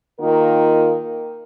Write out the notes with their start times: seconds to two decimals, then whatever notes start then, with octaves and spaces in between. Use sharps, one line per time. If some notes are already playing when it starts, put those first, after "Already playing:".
0.19 D#3 A#3 F4 A#4